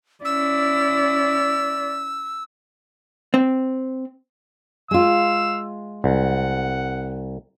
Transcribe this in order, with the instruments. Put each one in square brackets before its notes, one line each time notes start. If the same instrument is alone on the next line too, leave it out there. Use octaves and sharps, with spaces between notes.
[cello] C#4 E4 [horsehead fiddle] D5 [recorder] E6
[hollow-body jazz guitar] C4
[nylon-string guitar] G#3 F4 [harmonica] F5 E6
[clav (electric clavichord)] C2 [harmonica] F#5